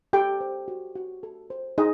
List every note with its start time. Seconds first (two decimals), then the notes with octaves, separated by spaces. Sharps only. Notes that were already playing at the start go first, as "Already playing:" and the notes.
0.13 G4 A4 G5
0.41 C5
0.68 F#4
0.95 F#4
1.23 A4
1.50 C5
1.78 D#4 G#4 D#5